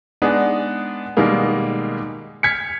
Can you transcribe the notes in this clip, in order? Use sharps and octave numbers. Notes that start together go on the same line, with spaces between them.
G#3 B3 D4 D#4 G#4
B2 D#3 G3 G#3 A#3
F6 G#6 B6 C#7